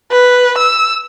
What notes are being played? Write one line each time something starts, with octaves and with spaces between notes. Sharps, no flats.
B4
E6